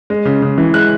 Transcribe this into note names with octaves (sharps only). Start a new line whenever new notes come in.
G#3
C#3
C#3
E3
G#3 F#6